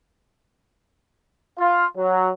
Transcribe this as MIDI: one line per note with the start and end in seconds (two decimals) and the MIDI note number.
1.58 1.85 65
1.97 2.29 54